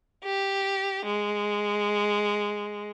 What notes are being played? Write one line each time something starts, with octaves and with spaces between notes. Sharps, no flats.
G4
G#3